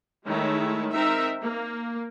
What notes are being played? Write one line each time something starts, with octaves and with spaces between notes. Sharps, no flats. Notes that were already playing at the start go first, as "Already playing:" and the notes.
D#3 G#3 A3 E4 C#5 E5
C4 D#4 A#4 E5
A#3